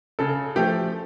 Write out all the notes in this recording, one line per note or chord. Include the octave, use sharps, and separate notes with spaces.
C#3 A4
F3 A3 G4